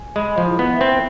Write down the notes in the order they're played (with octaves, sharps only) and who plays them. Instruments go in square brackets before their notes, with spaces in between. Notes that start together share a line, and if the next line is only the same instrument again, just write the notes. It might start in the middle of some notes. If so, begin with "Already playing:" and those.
Already playing: [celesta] G#5
[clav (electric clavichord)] G#3 [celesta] B5
[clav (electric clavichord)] F3
[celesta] E4
[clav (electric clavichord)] B3
[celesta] E5
[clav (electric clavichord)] C4